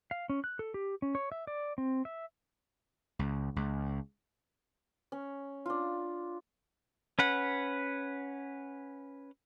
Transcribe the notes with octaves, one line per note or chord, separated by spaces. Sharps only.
F5
C#4
F#6
A4
G4
C#4
C#5
E5
D5
C4
E5
C#2
C#2
C#4
D4 F4
C#4 B4 F#5